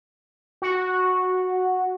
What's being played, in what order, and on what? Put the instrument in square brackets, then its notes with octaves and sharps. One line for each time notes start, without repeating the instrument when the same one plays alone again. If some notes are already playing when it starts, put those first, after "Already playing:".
[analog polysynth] F#4